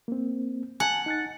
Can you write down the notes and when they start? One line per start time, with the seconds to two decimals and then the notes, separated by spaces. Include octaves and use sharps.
0.08 A#3 C4
0.80 F#5 G#5 A5
1.06 D#4 F#6 A6